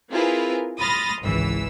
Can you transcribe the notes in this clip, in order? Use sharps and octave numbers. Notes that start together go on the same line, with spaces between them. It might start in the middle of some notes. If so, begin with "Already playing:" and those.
C4 E4 F4 G#4 A#4 B4
B5 C6 D#6 F6 A6 A#6
G#1 C#2 E3 E6